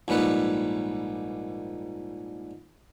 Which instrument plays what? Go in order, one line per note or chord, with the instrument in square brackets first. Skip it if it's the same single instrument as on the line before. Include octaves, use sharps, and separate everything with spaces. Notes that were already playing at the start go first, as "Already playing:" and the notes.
[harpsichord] A#1 G#2 G3 B4 C#5